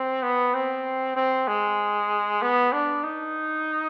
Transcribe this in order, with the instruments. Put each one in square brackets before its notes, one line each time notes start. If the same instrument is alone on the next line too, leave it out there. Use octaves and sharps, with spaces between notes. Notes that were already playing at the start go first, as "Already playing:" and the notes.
Already playing: [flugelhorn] C4
B3
C4
C4
G#3
B3
D4
D#4